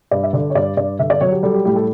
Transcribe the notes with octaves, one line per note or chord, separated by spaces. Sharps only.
G2 D5
E5
D3 D5
C#5
G2 D5
G2 D5
D3 E5
D5
F#3 C#5
G4
G3 A4
G4
A2 G4
A4